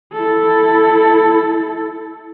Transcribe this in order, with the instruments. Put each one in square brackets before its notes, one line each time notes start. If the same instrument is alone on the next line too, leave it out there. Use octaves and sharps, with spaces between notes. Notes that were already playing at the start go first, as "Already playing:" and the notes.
[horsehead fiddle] E4 A4